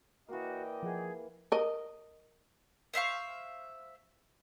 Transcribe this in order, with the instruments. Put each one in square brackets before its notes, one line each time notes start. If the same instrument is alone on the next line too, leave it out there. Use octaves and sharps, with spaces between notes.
[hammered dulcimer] E3 A#3 [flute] F#4 [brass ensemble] D5 D#5 G5
[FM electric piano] F3 F#5 [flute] G#4
[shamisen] A#4 D#5
[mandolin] C5 E5 F5 C#6